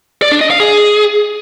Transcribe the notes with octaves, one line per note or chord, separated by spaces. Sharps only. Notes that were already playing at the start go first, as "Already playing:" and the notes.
D5
D4
D#5
F5
G#4